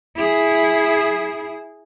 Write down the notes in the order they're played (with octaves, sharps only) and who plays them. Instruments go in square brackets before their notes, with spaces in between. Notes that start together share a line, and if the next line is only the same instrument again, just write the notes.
[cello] E4 G#4